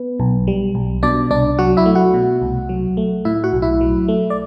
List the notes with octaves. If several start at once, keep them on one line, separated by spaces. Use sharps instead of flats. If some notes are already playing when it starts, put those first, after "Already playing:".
Already playing: B3 B4
B1
G3
B1
B2 D4 D5
C2 D4 D5
F#3 F#4 F#5
E4 E5
A3
F#4 F#5
B2
C2
F#3
A3
A2 E4 E5
F#4 F#5
B1
E4 E5
F#3
A3
D5